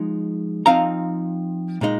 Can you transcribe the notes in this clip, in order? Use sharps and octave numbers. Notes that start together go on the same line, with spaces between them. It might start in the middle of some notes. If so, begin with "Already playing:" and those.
Already playing: F3 G#3 D#4
F3 C4 D#4 F5 A#5
A#2 G#3 D#4